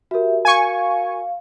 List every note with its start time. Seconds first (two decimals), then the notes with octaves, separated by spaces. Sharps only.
0.11 F#4 G4 A#4 E5
0.45 F5 G#5 C#6